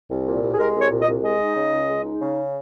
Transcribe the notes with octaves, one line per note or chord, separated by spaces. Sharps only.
C2
A#2
C2
G#4
G#3 A#4
C2
C#5
A#2
D#5
C2
G#3 D#5
D#4
C#3
C#2
G#3
D#4
C#3